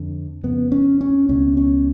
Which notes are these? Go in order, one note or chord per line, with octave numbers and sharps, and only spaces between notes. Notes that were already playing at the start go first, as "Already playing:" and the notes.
Already playing: F2 D3
F2 C#3 B3
C#4
C#4
C#2 B2 C#4
C#4